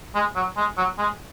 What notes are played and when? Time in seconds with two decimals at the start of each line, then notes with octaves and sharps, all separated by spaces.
0.15 G#3
0.36 F#3
0.57 G#3
0.78 F#3
0.99 G#3